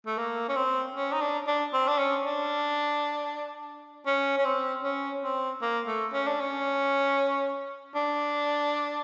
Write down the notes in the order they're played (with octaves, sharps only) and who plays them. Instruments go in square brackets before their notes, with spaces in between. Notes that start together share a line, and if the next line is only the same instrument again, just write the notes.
[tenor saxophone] A3
A#3
C#4
C4
C#4
D#4
D4
D4
C4
D4
C#4
D4
C#4
C#4
C4
C#4
C4
A#3
A3
C#4
D4
C#4
D4